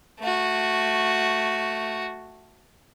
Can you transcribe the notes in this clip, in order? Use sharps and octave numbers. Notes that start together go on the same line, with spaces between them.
A3 F#4